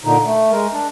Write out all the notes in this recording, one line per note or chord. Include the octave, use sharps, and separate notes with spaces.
A#2 D3 D#4
A3
G#3 A#4
D4